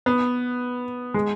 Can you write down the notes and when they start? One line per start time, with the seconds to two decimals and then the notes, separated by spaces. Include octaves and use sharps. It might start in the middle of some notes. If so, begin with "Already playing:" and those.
0.06 B3
1.14 G#3